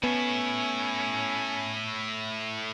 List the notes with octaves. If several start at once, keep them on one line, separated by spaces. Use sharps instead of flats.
A2 B3 C#4 E4